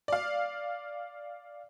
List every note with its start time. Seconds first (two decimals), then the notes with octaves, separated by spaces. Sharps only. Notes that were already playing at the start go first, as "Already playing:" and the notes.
0.08 D5 F5